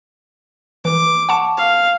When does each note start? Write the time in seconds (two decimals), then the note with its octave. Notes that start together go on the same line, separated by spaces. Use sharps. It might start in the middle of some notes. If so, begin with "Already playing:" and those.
0.85 E3 D6
1.29 F#5 A5 C#6
1.57 F5